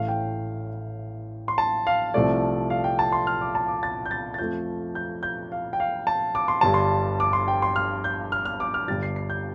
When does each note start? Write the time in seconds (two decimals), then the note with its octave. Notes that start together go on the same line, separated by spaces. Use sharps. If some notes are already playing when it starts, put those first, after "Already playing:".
Already playing: A1 A2 A3 F5
0.08 G5
1.48 C6
1.58 A5
1.87 F5
2.14 C2 C3 F3 A3 D5
2.70 F5
2.84 G5
2.99 A5
3.12 C6
3.27 F6
3.41 D6
3.55 A5
3.68 D6
3.83 A6
4.06 G6
4.11 A6
4.34 A6
4.38 F2 F3 A3 G6
4.95 G6
5.23 G6
5.52 F5
5.73 G5
5.80 F5
6.07 A5
6.35 D6
6.48 C6
6.61 G1 G2 G3 A5
6.74 C6
7.20 D6
7.33 C6
7.48 G5
7.62 C6
7.76 F6
8.04 G6
8.32 F6
8.45 F6
8.60 D6
8.74 F6
8.88 G1 G2 G3 A6
9.03 C7
9.16 C7
9.30 G6